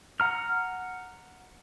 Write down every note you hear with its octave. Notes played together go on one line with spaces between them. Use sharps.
F#5 A#5 F6